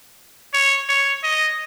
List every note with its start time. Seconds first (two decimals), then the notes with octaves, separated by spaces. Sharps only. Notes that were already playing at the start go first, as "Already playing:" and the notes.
0.54 C#5
0.89 C#5
1.24 D#5